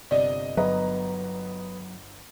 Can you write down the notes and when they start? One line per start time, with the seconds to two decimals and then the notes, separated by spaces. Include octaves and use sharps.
0.11 G1 C3 D5 D#5
0.57 G1 F#3 B3 B4 D#5 A#5